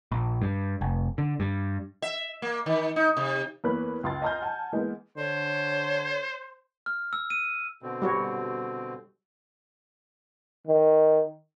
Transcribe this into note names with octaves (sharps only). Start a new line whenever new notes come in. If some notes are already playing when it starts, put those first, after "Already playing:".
A#1
G2
F1
D3
G2
E5
A#3
D#3
D#4
C3
E2 A#3 B4 C#5 B5 F#6
C#2 C6 A6
D#5 G#5 A#5 C6 F6 G6
F#5 G#5 A5
E3 G#3 A#3 B3
D3 C5 C#5
F6
E6
D#7
B2 D3 C4
G3 F#4 C#5
D#3